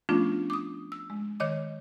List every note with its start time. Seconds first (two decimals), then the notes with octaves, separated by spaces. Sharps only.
0.09 F3 A3 B3 C#4 D4 F4
0.50 D6 D#6
0.92 E6
1.10 G#3
1.40 D#3 C#5 D#5 D6